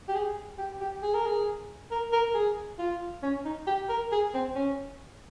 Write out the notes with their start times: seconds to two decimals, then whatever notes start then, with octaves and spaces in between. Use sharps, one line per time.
0.08 G4
0.14 G#4
0.58 G4
0.81 G4
1.02 G#4
1.14 A#4
1.26 G#4
1.91 A#4
2.12 A#4
2.34 G#4
2.79 F4
3.23 C#4
3.45 D#4
3.67 G4
3.89 A#4
4.12 G#4
4.34 C4
4.55 C#4